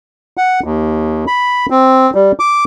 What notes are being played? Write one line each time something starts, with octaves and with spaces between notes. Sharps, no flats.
F#5
D#2
B5
C4
G3
D6